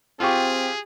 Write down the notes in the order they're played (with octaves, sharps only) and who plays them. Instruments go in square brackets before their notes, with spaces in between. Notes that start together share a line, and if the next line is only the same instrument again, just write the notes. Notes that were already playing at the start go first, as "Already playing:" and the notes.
[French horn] C4 [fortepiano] F4 G4 C#6 [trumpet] G#4